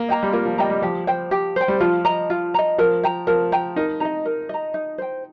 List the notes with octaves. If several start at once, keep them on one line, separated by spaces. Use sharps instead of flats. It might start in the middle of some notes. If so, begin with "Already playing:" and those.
Already playing: A#3
D#5 G5 A#5
G3
A#3 F4
F3
G3 D#5 G5 A#5
G3
F3 G4
C5 G5
G4
C5 G5
G3
F3 F4
D#5 A#5
F4
D#5 A#5
F3 A#4
G5 A#5
F3 A#4
G5 A#5
D#4 A#4
D#4 D#5 A#5
A#4
D#5 A#5
D#4
C5 G5